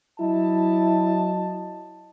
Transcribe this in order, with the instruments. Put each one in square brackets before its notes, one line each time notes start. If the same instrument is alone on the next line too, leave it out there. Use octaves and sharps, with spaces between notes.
[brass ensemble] F#3 D#5 A5 [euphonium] E4